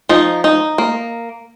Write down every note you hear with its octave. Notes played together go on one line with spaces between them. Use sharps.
F3 D#4
D#4
A#3